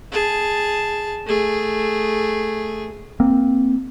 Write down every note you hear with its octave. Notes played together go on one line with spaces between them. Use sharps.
G#4 A5
A3 G#4
A#3 C4